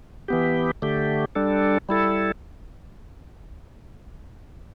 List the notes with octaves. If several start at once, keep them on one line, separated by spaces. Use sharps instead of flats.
E3 B3 G4
D3 A3 G4
G3 D4 A4
G3 E4 A4